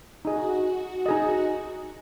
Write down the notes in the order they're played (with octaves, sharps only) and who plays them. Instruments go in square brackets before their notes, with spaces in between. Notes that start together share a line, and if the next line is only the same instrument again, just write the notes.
[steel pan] D#4 G#4 D#5 [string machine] F#4
[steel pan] D#4 G#4 D#5